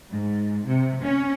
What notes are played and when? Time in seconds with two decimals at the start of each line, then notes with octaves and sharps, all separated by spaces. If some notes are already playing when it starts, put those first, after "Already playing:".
0.11 G#2
0.67 C3
1.03 C#4